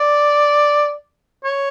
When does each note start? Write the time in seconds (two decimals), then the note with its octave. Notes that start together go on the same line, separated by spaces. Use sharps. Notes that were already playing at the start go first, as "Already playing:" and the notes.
Already playing: D5
1.44 C#5